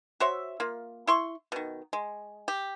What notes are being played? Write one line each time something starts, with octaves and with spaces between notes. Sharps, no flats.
F#4 C5 C#5 E5
A#3 F4
E4 C6 C#6
B2 D#3
G#3
G4